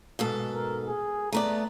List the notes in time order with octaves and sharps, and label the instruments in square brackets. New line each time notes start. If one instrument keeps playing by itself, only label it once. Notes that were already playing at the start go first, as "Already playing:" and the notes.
[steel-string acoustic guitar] G#2 B2 A4
[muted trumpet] A#4
G#4
[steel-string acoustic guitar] A3 B3 D5 [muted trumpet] A#5